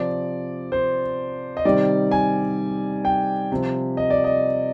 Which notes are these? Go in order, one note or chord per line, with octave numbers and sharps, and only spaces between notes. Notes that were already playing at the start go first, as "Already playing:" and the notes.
Already playing: C3 F3 D5
C5
D#5
C3 D#3 G3 D5
G#5
G5
C3 F3
D#5
D5
D#5